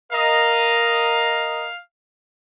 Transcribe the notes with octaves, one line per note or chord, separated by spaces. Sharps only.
A#4 D#5 F5